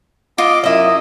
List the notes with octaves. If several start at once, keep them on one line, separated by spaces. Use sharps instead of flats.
F4 D#5 D6
F#2 E4 D#5